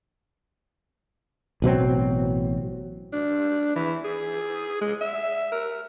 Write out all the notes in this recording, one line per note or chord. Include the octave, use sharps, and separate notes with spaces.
A1 B2 F#3 C4
D4
E3
G#4
G#3
E5
A#4